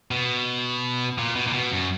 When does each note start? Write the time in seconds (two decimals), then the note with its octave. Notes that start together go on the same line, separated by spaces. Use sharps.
0.11 B2
1.18 A#2
1.36 B2
1.47 A#2
1.53 B2
1.71 F#2